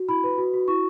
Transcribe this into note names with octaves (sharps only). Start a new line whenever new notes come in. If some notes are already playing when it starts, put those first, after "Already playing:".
Already playing: F#4
E4 B5
B4
F#4
F#4
E4 C#6